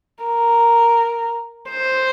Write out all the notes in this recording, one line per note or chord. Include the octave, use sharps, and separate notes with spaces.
A#4
C5